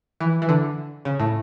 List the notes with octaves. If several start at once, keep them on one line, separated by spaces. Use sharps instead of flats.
E3
E3
D3
C#3
A2